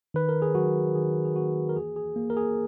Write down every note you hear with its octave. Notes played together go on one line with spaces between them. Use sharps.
D#3 B4
A#4
G#4
F#3 F#4
D#3 G#4
G#4
A#3 F#4
A#4
E3 G#4
G#4
A#3
A#4
G#4